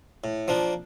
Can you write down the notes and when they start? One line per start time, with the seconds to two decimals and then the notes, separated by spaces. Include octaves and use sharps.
0.24 A2
0.48 F3 A#3 D4